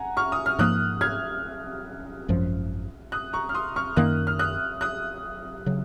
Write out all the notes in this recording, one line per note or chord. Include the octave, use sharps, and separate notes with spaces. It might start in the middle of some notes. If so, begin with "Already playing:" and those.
Already playing: F#5 G#5 A#5
C#6 F6
D#6
F6
G#2 F3 A#3 D#6 F#6
F6 G#6
G#1 F#2 F3
D#6 F#6
A#5 C#6
F6
C6 D#6
C#6 F6
F#2 D#3 A#3 D#6 F#6
F6
D#6 F#6
D#6 F#6
C#3 F#3